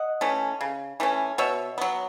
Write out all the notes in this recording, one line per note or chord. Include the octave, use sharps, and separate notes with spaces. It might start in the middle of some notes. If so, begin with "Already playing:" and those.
Already playing: D#5 F#5
E3 A3 C#4
C#3
E3 A3 C#4
B2 C#5 E5
F#3 B3